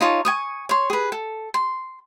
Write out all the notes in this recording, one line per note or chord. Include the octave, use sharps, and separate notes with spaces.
D#4 F4 C#5 A5
G#5 C#6 D#6
C#5 C6
G#4 B4
A4
C6